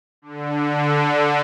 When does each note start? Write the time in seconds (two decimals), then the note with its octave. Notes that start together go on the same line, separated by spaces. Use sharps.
0.22 D3